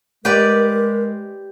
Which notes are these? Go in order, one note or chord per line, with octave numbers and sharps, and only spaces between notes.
G#3 G4 A#4 B4 D5